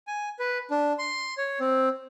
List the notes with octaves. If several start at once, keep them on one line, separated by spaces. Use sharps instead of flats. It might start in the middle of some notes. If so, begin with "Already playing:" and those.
G#5
B4
D4
C6
C#5
C4